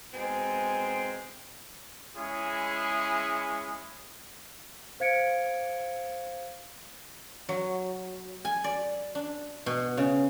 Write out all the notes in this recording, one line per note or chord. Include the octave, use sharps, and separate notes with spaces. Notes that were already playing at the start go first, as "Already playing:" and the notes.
B2 G#3 C4 D#4 G#5
G#3 C#4 E4 G#4
C5 F5 G#6 C#7 D7
F#3
G#5
D5
D4
B2
C#3